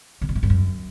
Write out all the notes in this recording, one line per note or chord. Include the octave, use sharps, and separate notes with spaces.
C3
B2
A2
G2
F#2